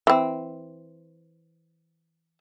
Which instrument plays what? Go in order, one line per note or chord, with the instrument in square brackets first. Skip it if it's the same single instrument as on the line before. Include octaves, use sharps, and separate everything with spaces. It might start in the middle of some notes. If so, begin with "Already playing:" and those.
[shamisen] E3 C4